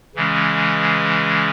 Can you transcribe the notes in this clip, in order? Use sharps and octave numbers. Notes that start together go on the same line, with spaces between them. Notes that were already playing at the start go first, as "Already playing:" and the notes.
C#3 E3 G#3 C#4